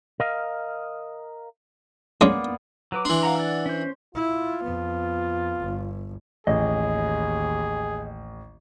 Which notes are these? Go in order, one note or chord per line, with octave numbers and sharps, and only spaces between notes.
A#4 D#5 F5
G#3 A#3 B3 C#4 D5
F#3 B4 D6
E3 D4 C6
F5 F#5 A#5
D5 F#5 E6
C#4 C5
E4 F4
F2 B3
G1
A1 D#2 G#4 D#5